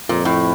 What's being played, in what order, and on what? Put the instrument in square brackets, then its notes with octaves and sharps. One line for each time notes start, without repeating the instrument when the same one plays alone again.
[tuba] F2 [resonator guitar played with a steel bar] A#2
[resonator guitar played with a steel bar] A2